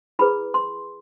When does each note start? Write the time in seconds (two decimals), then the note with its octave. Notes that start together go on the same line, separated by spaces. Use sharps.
0.19 E4 G#4 B4 B5
0.54 C6